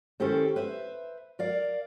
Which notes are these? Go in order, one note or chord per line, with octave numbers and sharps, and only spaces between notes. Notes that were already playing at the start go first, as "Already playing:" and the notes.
D#3 C#4 E4 G4 A4 C5
B4 C5 E5
A#4 D5 F5